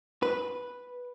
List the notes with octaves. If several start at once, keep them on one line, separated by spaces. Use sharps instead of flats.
B4